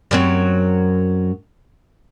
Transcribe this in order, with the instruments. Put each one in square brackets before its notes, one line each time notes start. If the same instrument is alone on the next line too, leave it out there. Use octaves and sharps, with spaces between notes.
[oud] F#2 F#3 C4